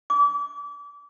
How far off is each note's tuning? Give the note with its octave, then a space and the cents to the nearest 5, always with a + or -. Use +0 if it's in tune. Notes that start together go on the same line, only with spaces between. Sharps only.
D6 -30